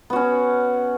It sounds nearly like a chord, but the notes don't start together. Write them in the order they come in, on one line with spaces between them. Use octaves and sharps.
B3 F#4 C#4